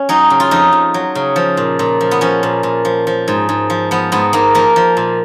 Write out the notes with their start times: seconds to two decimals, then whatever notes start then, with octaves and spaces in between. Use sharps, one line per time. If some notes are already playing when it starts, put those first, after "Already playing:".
Already playing: C#4
0.09 F#3 D#4
0.30 C#3
0.40 F4
0.51 F2 D#4
0.73 F2
0.94 F#3
1.15 C#3
1.36 F3
1.57 A#2
1.79 A#2
2.01 F3
2.11 B3
2.21 F3 C#4
2.43 A#2
2.63 A#2
2.85 F3
3.07 F3
3.28 G#2
3.49 G#2
3.70 F3
3.91 F3 B3
4.12 G#2 B3
4.33 G#2 A#3
4.55 F3 A#3
4.76 F3
4.97 A#2